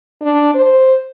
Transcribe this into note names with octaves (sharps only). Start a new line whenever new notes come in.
D4
C5